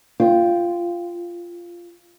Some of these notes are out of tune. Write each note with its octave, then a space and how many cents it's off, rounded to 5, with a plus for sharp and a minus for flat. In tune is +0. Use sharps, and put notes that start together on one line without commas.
F4 -10 G5 +0